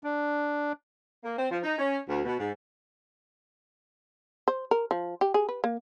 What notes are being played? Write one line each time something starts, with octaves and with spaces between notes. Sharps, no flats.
D4
A#3
C4
F3
D#4
C#4
D2
B2
G#2
C5
A#4
F3
G4
G#4
B4
A#3